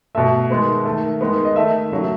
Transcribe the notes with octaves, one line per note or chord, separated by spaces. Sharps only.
B2 A3 E5
D#3 G#3 B3
D#3 A3
D#3 G#3 B3
D#5
D#3 A3 E5
C#3 F#3 A3